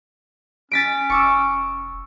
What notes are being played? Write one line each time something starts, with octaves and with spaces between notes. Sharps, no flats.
C#4 A6 B6 D7
F1 C#6 D6 E6